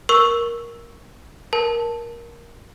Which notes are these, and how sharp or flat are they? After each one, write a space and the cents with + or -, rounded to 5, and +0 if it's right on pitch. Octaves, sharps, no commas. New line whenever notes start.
A#4 +10 C#6 +0 E6 +0
A#4 +15 A5 +0